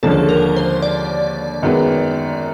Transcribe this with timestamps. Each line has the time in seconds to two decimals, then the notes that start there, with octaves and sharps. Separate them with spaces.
0.03 D#2 D3 F3 G#3 C#4 A4
0.29 A#4
0.56 C5
0.82 D5
1.62 F#2 D#3 G#3 B3